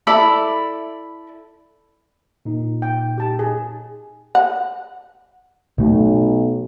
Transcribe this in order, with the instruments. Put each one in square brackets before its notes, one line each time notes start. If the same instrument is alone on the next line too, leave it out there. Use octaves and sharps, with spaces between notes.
[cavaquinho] E4 A4 D5 B5
[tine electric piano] A#2 D#4
[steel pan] G5
G4 A5
G#4
[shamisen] F#5
[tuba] B1 [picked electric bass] B2 A3